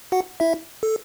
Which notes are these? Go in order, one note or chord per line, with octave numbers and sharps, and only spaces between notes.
F#4 F#5
E4 E5
A4